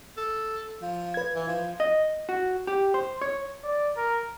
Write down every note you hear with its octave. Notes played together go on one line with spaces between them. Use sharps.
A4
F3
B4 G#6
E3
F3
D#5
F#4
G4
C5
C#5
D5
A#4